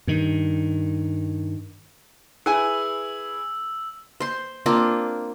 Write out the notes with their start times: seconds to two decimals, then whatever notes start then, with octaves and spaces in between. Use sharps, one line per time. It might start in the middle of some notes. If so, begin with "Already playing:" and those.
0.07 G2 D#3
2.46 E4 G#4 B4 G#5 E6
4.20 C5 C6
4.66 A#3 C4 D4 F4